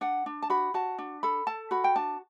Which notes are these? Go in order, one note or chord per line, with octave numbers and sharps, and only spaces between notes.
D4 F#5
D4
A5
F#4 B5
F#4 A5
D4
A4 B5
A4 A5
F#4 B5
G5
D4 A5